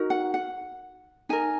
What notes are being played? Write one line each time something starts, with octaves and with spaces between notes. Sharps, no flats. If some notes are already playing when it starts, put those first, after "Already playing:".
Already playing: D#4 F#4 A#4
F#5
F#5
D#4 A#4 G#5